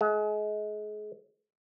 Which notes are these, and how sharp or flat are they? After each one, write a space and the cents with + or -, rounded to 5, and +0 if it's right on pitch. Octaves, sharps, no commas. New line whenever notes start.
G#3 +30